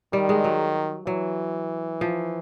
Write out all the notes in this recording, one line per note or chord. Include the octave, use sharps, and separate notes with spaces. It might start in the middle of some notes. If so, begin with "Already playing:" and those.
D#3 G3
G#3
F#3
E3 F#3
F3